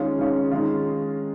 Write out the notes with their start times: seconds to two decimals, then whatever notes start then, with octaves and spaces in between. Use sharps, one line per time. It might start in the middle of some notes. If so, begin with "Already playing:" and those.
Already playing: D#3 G#3 C#4 F4
0.18 D#3 G#3 C#4 F4
0.51 D#3 G#3 C#4 F4